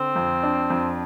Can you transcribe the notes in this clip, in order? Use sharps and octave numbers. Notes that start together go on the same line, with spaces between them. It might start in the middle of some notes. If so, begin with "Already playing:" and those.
Already playing: D3 C4
F2
D4
F2